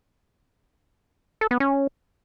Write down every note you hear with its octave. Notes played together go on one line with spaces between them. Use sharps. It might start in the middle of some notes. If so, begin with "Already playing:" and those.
A4
B3
C#4